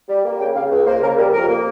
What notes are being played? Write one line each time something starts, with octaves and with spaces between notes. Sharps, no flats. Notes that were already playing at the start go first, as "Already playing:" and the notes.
G3
A#3
C#3 G5
C#3 F5
C#2
A#3 C5
C#3 A#4
G3 A#4
F2 A#4
A#3